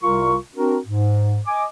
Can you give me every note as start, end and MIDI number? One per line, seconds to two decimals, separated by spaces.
0.02 0.36 36
0.02 0.36 48
0.02 0.36 55
0.02 0.36 65
0.02 0.36 70
0.02 0.36 85
0.54 0.77 60
0.54 0.77 62
0.54 0.77 66
0.54 0.77 70
0.87 1.38 44
1.46 1.64 75
1.46 1.64 80
1.46 1.64 86